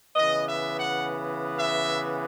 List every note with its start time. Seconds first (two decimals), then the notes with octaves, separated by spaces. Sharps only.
0.15 C#3 E3 B3 D#5
0.46 E5
0.78 F#5
1.56 E5